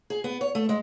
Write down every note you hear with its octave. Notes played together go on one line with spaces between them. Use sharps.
G#4
B3
C#5
A3
G#3